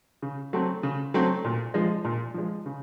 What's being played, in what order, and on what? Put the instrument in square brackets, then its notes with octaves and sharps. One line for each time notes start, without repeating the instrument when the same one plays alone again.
[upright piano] C#3
F#3 A3 C4
C#3
F#3 A3 C4
A#2
F3 G#3
A#2
F3 G#3
C#3